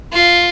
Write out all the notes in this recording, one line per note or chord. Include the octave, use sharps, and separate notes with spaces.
F4